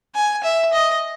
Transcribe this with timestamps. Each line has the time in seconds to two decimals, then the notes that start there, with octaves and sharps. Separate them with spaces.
0.15 G#5
0.44 E5
0.73 D#5